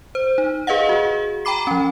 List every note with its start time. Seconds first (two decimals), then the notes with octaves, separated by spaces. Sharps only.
0.15 C5
0.38 D#4
0.67 G#4 B4 D#5 F5 F#5
0.89 F#4 G#4
1.45 G5 A#5 B5 D6 C7
1.67 F3 C#4